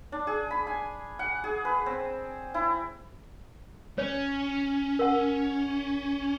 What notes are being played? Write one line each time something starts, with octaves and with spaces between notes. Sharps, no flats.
D4
G#4
B5
G#5
F#5
G#4
B4
C4
E4
C#4 C#5
A#4 F#5